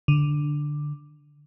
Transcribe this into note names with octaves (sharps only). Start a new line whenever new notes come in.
D3